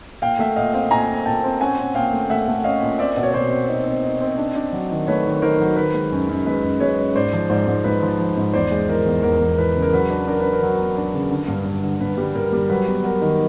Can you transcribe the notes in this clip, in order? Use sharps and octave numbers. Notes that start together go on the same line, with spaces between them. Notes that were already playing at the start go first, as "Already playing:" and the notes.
A#2 F5 G5
A3 E5 F#5
A#2 D#5 F5
C4 D#5 F5
A#2 G#5 A#5
C4
A#2 G5 A5
C4
C#4 F#5 G#5
C#4
A#2 F5 G5
A3
A3 E5 F#5
A3
C#4 D#5 F5
A#2
C4 D5 E5
B2
C#5
B2 C5 D5
C4
D#4
C4
D#4
C4
D4
D4
F#3
D#3
A3 B4 C#5
D#3
D#3 A#4 C5
F#3
D#3 B4
G#3
F#2
F#2
G#3 B4
F#2
G#3 B4 C#5
F#2
G#2 C5 D5
F3
G#2 C5 D5
G#2
G#2 B4
F3
F3
G#2
E2 C5 D5
G#3
E3 A#4
E2
E2 A#4
E2
E3 B4
C#3
A#4
F#3 B4
D4
D4 A#4
D4 B4
A#4
F#3
B3
D4
C#3
D3
G2
G2
D3
G2 B4
G3
G2 A#4
G3
F#3 B4
B3
B3 A#4
D#3